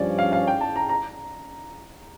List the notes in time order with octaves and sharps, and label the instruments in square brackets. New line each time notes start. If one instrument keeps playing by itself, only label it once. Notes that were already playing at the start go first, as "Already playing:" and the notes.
Already playing: [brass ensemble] G2 F3 C#4 [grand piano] D5
[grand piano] F5
F5
G5
A5
A#5
A#5